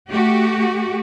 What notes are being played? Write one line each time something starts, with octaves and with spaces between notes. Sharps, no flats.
A3 F#4 G4